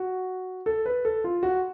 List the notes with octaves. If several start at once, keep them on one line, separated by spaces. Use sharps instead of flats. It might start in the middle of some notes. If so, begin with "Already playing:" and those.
Already playing: F#4
A4
B4
A4
F4
F#4